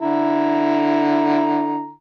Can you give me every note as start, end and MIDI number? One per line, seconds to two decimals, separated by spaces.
0.01 1.91 50
0.01 1.91 64
0.01 1.91 82